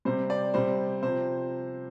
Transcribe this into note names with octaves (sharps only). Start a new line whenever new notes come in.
C3 G3 C5
D5
C3 G3 C5
C3 F3 C5